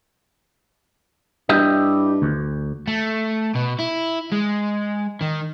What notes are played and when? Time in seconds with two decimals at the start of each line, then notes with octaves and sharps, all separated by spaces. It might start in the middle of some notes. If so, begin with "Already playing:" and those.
1.49 G2 E4 G4 D#5
2.22 D2
2.87 A3
3.55 B2
3.79 E4
4.32 G#3
5.22 D#3